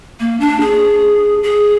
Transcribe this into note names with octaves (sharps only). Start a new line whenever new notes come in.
A#3
D4
G#4
G#4